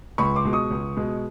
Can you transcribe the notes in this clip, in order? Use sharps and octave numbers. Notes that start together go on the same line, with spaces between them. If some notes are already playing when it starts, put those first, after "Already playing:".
C#2 B5 C#6
C6 D6
B2 G#3
C#6 D#6
C#2
B2 G#3